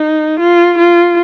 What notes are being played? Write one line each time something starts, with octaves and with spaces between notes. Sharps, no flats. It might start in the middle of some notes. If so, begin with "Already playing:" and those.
Already playing: D#4
F4
F4